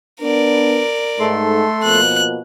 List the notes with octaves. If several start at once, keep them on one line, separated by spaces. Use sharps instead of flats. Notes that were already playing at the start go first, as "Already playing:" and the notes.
B3 D4 A#4 B4 D5
G#2 A3 A4 C6
B2 F3 A#3 F#6